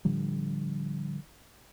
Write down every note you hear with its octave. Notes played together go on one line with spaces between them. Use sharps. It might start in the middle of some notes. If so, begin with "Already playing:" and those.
A2 D3 F3 G3